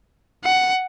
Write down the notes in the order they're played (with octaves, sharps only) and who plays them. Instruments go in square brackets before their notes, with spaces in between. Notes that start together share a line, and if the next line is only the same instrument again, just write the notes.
[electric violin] F#5